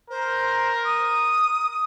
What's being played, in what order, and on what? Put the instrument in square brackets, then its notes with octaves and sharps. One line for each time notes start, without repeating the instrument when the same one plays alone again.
[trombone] A#4 [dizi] C5
[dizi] D#6